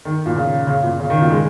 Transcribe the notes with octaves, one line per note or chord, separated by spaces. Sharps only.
D#3
A#2
C#3
C#3
A#2
C#3
D#3
A#2
G#3